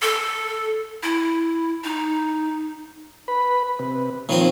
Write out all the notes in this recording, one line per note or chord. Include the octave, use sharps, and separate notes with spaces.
A4
E4
D#4
B4 B5
C3 B4
A#2 D#3 F3 C4 C#5